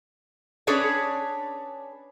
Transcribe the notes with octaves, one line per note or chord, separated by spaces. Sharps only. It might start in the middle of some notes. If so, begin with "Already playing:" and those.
C#4 D4 G#4 B4 C#5 D5